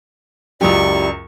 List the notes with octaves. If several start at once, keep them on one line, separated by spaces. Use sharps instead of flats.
C#2 F#2 E4 F4 G4 D5 C#6